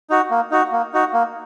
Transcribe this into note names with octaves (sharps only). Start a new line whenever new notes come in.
D#4 F#4
A#3
D#4 F#4
A#3
D#4 F#4
A#3